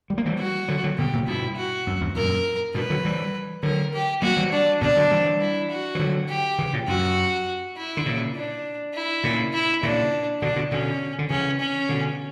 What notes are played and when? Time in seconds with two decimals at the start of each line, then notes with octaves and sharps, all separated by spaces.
0.10 G3
0.18 A#3
0.26 E3 G3
0.39 F#4
0.68 D3 F#3
0.84 D3 F#3
0.98 B2 D3 G4
1.13 A#2 C#3
1.27 G2 B2 E4
1.56 F#4
1.87 F#2
2.01 E2 G2
2.16 F#2 A#2 A#4
2.74 G2 B2 B4
2.90 D3 F#3
3.05 E3 G3
3.63 D3 F#3 A#4
3.93 G4
4.22 F#3 A#3 F#4
4.37 E3 G3
4.52 D4
4.81 B2 D3 D4
4.96 D3 F#3
5.11 E3 G3
5.41 E4
5.70 F#4
5.95 E3
5.99 D3 F#3
6.29 G4
6.58 C#3 E3
6.73 A#2 C#3
6.88 F#2 F#4
7.77 E4
7.97 D3
8.06 A#2 C#3
8.35 D4
8.94 E4
9.24 A#2 C#3
9.53 E4
9.83 A#2 C#3 D4
10.42 B2 D3 D4
10.56 B2 D3
10.71 B2 D3 C#4
11.19 D3
11.30 C#3 E3 C#4
11.60 C#4
11.89 B2 D3